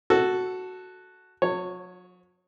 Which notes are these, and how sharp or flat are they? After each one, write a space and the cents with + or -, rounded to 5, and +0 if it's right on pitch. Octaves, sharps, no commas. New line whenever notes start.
F#4 +0 A4 +0
F#3 -40 C#5 +0